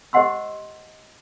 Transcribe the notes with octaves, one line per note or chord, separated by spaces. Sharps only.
G4 C5 D#5 F#5 C6 E6